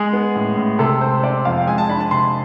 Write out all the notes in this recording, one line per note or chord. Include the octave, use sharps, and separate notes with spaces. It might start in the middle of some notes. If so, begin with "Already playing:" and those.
Already playing: G#3 G#4
B3
A2
A2
C3 A4
G#3 C5
C4 D5
F2 F5
G#3 G#5
A5
D4 B5
A5
C3 C6